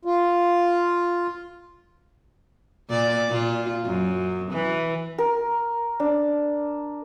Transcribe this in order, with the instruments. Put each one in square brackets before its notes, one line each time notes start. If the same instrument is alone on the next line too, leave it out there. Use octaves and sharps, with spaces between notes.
[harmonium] F4
[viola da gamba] A#2 D5
A#2 F4
F#2
E3
[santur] A#4
D4